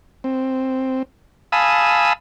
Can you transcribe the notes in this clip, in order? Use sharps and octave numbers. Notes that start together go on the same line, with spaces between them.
C4
F5 G#5 A5 B5 D#6 E6